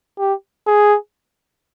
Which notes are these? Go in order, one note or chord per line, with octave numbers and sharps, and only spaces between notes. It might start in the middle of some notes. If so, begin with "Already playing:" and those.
G4
G#4